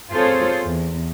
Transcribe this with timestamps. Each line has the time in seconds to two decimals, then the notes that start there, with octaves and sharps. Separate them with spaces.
0.11 C4 F4 G#4 A4 C5 C#5
0.63 E2